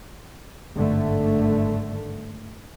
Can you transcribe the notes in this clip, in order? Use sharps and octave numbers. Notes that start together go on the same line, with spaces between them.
G#1 G2 D3 A3